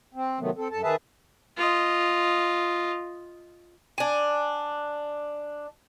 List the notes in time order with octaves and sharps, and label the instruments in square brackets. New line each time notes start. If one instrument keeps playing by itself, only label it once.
[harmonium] C4
C3 D#3 F#3 A3 B3
C4 A4
F#2 A4 A5
D#3 G#4 B4 E5 A5
[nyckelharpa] F4 D#5
[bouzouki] D4 G#5